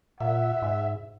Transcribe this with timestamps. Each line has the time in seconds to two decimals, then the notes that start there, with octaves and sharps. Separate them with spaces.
0.20 A#2 E5 F#5
0.62 G#2